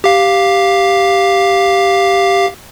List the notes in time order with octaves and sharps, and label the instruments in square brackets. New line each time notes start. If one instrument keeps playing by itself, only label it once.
[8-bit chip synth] G4 F5